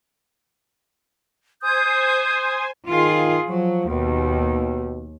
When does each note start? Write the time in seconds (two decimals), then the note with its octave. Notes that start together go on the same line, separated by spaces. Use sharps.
1.62 C5 G#5 D#6 G6
2.89 D#3 F4 G#4
3.48 F3 F#3
3.90 D#2 B2